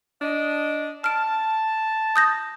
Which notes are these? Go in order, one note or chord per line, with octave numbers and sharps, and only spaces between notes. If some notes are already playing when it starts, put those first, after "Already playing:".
D4 D#5
A5 F6 D7
D#6 G6 A#6